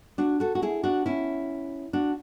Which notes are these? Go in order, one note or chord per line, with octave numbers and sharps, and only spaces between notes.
D4 F#4
F#4 A4
F#4
E4 G#4
D4 F#4
C#4 E4
D4 F#4